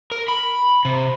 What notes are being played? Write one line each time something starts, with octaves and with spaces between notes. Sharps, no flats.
A#4
B5
C3